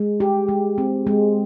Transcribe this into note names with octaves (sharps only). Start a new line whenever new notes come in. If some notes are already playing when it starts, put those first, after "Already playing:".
Already playing: G#3
G4
G#3
C4
G#3